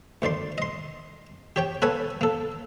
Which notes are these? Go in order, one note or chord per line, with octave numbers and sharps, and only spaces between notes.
D2 D#3 D5 C6
D#5 C6
G4 C#5 G5
A#3 A4 B4 C#5 F#5 G#5
A#3 A4